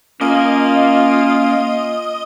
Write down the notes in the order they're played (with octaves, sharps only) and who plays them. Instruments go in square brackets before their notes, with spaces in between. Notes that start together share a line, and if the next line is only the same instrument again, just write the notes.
[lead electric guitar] A#3 A#4 [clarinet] C#4 [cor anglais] F4 [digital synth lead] D#5